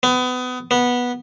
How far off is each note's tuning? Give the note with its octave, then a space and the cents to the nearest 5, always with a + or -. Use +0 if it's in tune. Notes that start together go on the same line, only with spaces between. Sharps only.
B3 +30
B3 -10